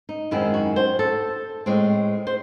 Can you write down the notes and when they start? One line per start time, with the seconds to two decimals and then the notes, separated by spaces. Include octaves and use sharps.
0.09 D#4
0.31 F#2 D#3 G#3 C4 E4
0.54 F#4
0.76 C5
0.99 A4
1.66 A2 G#3 C4
2.27 C5